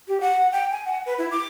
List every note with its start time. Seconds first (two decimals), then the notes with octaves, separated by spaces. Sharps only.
0.08 G4
0.21 F#5
0.52 G5
0.71 G#5
0.85 F#5
1.06 B4
1.18 E4
1.31 D6